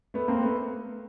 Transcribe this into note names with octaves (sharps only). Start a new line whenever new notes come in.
A3 B3
A#3 C4
A3 B3